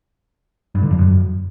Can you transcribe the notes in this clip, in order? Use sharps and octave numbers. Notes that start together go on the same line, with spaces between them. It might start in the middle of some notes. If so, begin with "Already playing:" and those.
G2
D3
F2
F#2